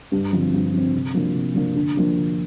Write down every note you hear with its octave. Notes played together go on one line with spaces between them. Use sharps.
G2
D3 F3 C4
G2
D3 F3 C4
C3
F3 A#3 D4
C3
F3 A#3 D4
D3
F3 A#3 D4
D3